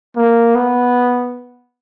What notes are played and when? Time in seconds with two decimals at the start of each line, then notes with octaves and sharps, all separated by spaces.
0.16 A#3
0.55 B3